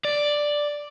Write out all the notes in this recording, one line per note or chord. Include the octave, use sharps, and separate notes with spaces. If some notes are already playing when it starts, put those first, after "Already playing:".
D5